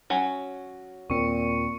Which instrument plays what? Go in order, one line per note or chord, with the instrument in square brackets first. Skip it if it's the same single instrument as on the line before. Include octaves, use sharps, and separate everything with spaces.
[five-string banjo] F#3 C#4
[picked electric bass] D#2 C4 [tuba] A#2 [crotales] C#6 C#7